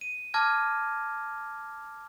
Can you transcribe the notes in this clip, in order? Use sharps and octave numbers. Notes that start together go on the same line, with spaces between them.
D#7
A5 D6 F6 G#6 A#6